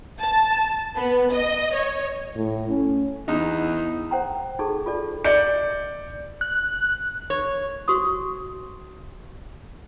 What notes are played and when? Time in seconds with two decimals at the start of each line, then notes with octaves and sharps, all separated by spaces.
0.20 A5
0.96 B3
1.33 D#5
1.76 C#5
2.36 A2
2.69 C#4
3.28 E2 D#4
4.11 C5 F#5 G5 A#5
4.59 D#4 G#4 A4 C#6
4.86 F4 A4 D5
5.24 D5 G6 C#7
6.41 F#6
7.30 C#5
7.88 F#4 C5 C6 C#6 D#6